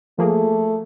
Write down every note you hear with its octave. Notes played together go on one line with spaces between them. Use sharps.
F3 A3 A#3 G#4